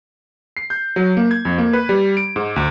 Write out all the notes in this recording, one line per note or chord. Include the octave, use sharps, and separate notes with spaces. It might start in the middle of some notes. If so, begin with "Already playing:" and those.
C7
G6
F#3
A#3
G#6
F2
A#3
B4
G3
D7
G#2
D2